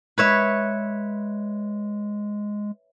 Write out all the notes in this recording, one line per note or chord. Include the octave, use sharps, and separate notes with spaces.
G#3 B4 C#5 E5